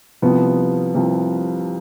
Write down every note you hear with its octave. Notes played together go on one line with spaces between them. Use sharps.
C2 C3 F3 B3
C2 C3 F3